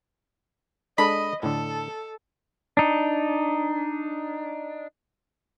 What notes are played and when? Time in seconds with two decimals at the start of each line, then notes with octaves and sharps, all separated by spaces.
0.98 G#3 D4 A4 D#5 B5
1.43 A2 D3 A4
2.77 D4 D#4